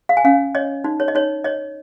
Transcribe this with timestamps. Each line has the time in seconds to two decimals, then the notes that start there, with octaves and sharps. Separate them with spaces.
0.09 F5
0.17 G#5
0.24 C#4 F5
0.55 C#5 D#5
0.84 D#4
1.00 C#5
1.08 D#5
1.15 D#4 C#5
1.44 C#5 D#5